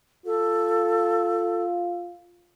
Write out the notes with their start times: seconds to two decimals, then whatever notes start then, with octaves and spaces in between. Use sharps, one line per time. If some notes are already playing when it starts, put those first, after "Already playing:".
0.26 F4 A4